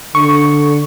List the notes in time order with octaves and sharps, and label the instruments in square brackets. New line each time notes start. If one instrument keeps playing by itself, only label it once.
[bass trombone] D3 [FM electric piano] C#6